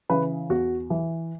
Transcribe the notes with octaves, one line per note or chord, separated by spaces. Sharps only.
C#3 E3 B4
E2 F#4
E3